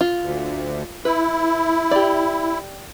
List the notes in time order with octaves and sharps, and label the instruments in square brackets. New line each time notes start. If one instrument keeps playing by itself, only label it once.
[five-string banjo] F4
[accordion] D2
[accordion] E4 [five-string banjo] B4
[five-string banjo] G4 D5